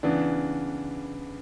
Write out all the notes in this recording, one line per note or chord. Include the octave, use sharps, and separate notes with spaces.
C#3 E3 B3 D4